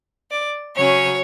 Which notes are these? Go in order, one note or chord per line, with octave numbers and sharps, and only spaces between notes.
D5
C#3 F#3 C#4 C#5